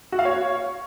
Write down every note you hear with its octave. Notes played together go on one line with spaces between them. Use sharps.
F#4
F5
C#5